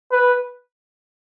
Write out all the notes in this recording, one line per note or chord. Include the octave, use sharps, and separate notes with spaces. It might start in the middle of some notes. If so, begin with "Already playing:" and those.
B4